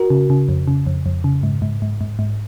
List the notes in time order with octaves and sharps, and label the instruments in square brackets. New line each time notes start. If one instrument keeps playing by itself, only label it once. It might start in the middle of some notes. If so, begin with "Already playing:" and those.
Already playing: [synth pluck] F#4 A#4
C#3
C#3
F2
C#3
F2
F2
C#3
G#2
G#2
G#2
G#2
G#2